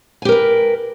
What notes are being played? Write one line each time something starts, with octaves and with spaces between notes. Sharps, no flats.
G4 A#4 B4 G#5